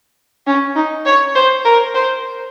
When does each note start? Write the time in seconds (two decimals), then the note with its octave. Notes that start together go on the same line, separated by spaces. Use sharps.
0.47 C#4
0.76 D#4
1.05 C#5
1.35 C5
1.65 A#4
1.95 C5